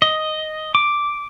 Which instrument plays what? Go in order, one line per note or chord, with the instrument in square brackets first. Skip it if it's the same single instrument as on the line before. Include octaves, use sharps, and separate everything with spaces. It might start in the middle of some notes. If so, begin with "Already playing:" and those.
[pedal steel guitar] D#5
D6